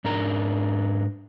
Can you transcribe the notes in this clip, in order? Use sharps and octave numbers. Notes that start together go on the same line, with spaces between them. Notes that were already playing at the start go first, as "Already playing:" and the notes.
G#2 D4 A#4 A#5